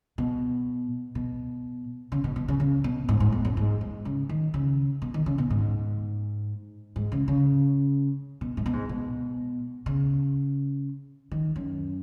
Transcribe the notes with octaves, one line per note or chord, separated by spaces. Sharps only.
B2
B2
C#3
B2
B2
C#3
C#3
B2
G#2
G#2
B2
F#2
G#2
G#2
C#3
D#3
C#3
B2
D#3
C#3
B2
G#2
G#2
C#3
C#3
B2
G#2
B2
G#2
B2
C#3
D#3
F#2